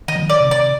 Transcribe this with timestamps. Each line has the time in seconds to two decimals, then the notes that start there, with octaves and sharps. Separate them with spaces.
0.08 D#3 D#5
0.16 F3
0.23 D#3
0.29 D5
0.40 C3
0.51 D5